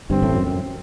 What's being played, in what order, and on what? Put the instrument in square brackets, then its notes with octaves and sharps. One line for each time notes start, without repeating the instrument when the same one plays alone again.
[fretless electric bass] G1 G2 [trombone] C4
[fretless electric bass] A1 A2
F#2
F#2